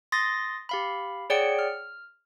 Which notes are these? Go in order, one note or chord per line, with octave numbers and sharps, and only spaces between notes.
C6 D#6 A6 A#6
G4 F5 B5
G#4 C#5 D5 F#5 G5 C#7
F6